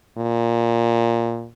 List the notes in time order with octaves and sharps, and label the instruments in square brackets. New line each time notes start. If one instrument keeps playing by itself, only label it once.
[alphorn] A#2